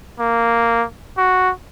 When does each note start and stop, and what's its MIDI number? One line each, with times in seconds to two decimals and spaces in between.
0.20 0.84 58
1.18 1.51 66